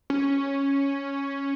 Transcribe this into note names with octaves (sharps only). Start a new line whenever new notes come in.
C#4